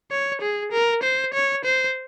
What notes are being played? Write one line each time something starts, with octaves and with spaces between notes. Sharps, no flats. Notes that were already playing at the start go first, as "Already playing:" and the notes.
C#5
G#4
A#4
C5
C#5
C5